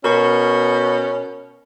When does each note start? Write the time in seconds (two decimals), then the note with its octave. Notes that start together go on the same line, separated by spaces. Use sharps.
0.04 B2 C#4 A#4 C#6